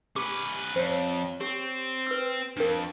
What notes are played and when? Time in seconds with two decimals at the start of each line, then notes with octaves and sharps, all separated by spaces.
0.16 C#4 G4 B4 D6
0.76 F2 C5 C#5
1.41 C4 G4
2.07 B4 E6
2.57 F2 D4 A#4